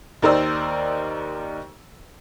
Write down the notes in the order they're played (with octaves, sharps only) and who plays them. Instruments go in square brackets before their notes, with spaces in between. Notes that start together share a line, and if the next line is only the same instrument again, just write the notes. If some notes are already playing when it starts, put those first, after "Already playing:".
[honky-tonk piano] D#2 D#4 A#4 C5 D5 E6